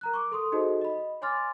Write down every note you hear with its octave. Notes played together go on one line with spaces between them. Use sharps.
A#4 A#5 F#6
C#6 D6
A4 C6 D#6
D#4 F#4 G#4 A4 C5 D#5
D#5 B5
C#5 G#5 C6 D6 F6 A6